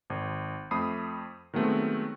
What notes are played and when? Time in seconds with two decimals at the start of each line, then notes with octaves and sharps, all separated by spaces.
0.10 G#1
0.71 F2 A3 B5 D#6 C7
1.54 D#3 F#3 G#3 A3 B3 C4